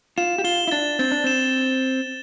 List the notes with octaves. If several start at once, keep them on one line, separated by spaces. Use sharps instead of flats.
F4 E7
G4
F4 G7
E4
D4 A6
C4 A6
D4
C4 E7